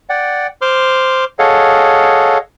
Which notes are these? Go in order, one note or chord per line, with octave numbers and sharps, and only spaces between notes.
D5 F#5 G5
C5 C6 D6 F6
G#4 A4 C#5 D#5 F5 F#5